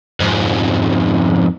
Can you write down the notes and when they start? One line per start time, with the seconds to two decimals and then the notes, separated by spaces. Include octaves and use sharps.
0.20 F2 G#2